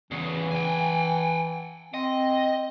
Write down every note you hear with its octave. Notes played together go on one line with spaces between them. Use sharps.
E2 C#3 E3
G5 G#5
C4 D#5